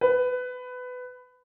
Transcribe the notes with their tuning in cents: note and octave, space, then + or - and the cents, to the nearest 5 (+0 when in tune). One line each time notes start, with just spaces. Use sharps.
B4 +20